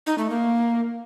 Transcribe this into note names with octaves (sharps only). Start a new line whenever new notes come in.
D#4
A3
A#3